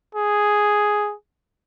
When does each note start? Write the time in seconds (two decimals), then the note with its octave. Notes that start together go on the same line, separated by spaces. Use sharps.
0.15 G#4